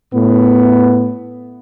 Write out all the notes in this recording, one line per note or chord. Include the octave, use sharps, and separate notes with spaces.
A2 B3